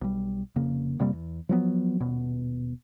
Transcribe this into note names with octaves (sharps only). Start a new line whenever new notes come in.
B1 G3
F1 C#3 A#3
F1 C3 G3 A#3
E2
F3 F#3 B3
D#1 B2 B3